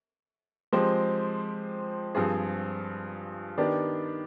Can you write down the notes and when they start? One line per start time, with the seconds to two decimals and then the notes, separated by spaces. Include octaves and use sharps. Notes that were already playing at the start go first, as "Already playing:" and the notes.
0.73 F3 G#3 C4 G4 C5
2.15 G2 F3 C4 F4 G#4
3.58 D#3 B3 D4 G4 D5